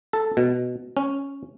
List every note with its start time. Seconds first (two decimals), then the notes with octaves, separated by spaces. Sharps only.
0.13 A4
0.37 B2
0.97 C#4